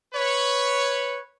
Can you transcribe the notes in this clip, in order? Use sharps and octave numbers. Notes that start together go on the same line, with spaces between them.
B4 C#5